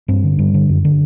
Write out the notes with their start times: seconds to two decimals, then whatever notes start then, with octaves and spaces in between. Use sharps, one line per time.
0.08 G2 C4
0.24 D3
0.39 G2
0.54 D3
0.69 F#2
0.85 D3